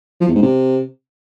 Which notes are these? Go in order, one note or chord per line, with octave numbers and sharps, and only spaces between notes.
F3
E2
G#2
C3